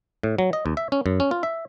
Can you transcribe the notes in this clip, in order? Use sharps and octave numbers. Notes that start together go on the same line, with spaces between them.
A2
F#3
D#5
D#2
E5
C#4
F#2
C#4
F4
E5